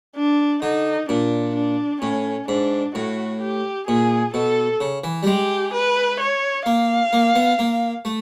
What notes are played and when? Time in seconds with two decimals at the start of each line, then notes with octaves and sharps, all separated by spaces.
0.16 D4
0.62 D3 D#4
1.09 A#2 D4
1.55 D4
2.02 A2 C#4
2.48 G#2 D4
2.95 A2 F#4
3.42 G4
3.88 A#2 G#4
4.34 B2 A4
4.81 C#3
5.04 E3
5.23 G3
5.26 G#3 G4
5.73 B4
6.20 C#5
6.66 A#3 F5
7.13 A#3
7.35 B3
7.59 A#3
8.05 A3